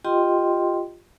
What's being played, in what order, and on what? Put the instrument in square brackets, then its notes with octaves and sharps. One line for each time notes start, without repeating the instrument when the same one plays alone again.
[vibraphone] F4 G4 D#5 G5 C6